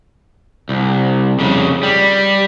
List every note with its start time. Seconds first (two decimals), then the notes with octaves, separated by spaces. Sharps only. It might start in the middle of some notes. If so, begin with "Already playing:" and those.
0.69 C2
1.39 F2 C#3
1.83 G3